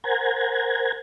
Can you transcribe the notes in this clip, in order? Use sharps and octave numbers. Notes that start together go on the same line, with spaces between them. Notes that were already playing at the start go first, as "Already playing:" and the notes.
A#4 C5 F#5 G#5 A#5 G#6